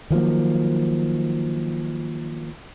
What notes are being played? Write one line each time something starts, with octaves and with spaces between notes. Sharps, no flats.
D#3 F3 F#3 A#3